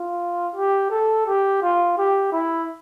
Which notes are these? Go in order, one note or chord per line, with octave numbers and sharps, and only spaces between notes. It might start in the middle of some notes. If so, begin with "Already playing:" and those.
Already playing: F4
G4
A4
G4
F4
G4
E4